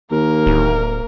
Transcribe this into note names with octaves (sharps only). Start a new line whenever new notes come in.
D#2 A#3 A#4
D1